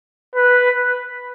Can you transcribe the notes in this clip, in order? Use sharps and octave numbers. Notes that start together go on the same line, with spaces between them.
B4